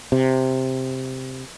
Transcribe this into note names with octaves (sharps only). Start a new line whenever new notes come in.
C3